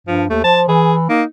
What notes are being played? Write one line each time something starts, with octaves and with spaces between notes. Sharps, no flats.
G2 F3
D#2 A3
F3 A5
E3 G#4
A#3 D#4